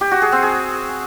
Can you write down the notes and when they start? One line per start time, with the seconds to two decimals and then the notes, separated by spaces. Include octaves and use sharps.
0.01 G4
0.11 F#4
0.22 G#4
0.32 C4
0.43 G#4